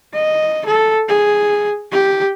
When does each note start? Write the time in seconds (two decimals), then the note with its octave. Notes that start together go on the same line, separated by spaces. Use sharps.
0.14 D#5
0.66 A4
1.09 G#4
1.92 G4